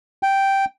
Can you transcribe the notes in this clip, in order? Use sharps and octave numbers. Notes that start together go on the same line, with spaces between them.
G5